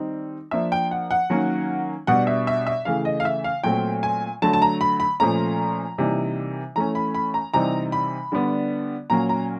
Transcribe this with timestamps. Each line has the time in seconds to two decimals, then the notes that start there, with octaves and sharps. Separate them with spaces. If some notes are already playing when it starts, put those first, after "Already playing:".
Already playing: D#3 G3 C4 D#4
0.51 F3 A#3 D4 E5
0.72 G5
0.91 F#5
1.11 F#5
1.30 D#3 F#3 A#3 C#4
2.07 B2 G3 B3 D4 F#5
2.27 E5
2.47 E5
2.67 E5
2.85 C#3 E3 A3 F5
3.05 D#5
3.20 F5
3.25 E5
3.44 F5
3.64 A#2 F#3 A3 C4 G5
4.03 G#5
4.42 D3 F#3 A3 A5
4.53 A5
4.62 A#5
4.81 B5
5.00 B5
5.20 A#2 F3 A3 C#4 A#5
5.98 C3 E3 G3 A#3 D#4
6.75 E3 A3 C#4 A#5
6.95 B5
7.15 B5
7.34 A#5
7.54 C3 E3 G3 C4 D#4 A#5
7.92 B5
8.32 D3 G3 B3 D4
9.10 A#2 F#3 A#3 C#4 A#5
9.29 A#5